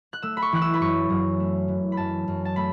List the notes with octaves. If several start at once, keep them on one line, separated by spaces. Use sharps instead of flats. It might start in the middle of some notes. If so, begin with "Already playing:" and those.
F#6
A3 E6
B5
C#6
E3 F#6
E6
B5
F#2 C#6
F#2
A3
E3
B5
F#2 A5
F#2
A5
A3 B5